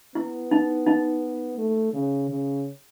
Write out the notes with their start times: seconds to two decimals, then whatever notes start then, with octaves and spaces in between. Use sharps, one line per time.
0.15 B3 E4
0.51 D#4
0.87 D#4
1.58 A3
1.93 C#3
2.29 C#3